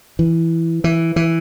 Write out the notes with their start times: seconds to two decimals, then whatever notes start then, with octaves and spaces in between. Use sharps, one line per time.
0.19 E3
0.84 E3
1.16 E3